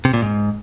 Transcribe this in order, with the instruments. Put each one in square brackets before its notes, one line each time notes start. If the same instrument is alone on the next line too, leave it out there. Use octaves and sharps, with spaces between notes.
[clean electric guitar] C3
A#2
G#2